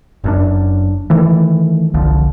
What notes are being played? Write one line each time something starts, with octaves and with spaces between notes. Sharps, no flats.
F#1 F#2 D4
D#3 E3 A3
G1 C2 D3 F3